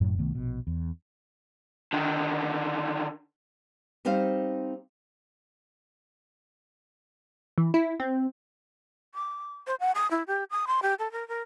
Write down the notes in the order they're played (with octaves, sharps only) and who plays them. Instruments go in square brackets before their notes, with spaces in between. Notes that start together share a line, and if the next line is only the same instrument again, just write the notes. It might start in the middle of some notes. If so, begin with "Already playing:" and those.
[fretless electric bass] F#1 F#2 A2 F#3
C2 D#3 A3 B3
A#1 B2
E2
[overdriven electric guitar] D3 D#3
[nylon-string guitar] G3 C4 D#4 C5 F5
[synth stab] E3
E4
C4
[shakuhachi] D6
C5
F#5
D#6
E4
G4
D#6
C6
G4
A4
A#4
A#4